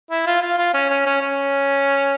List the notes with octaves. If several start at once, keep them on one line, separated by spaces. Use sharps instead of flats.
E4
F4
F4
F4
C#4
C#4
C#4
C#4